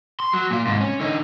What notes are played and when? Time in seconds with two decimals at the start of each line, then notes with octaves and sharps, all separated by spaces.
0.20 C6
0.33 F#3
0.50 A#2 F4
0.67 G#2 C3
0.81 C#4
1.00 D3 D#4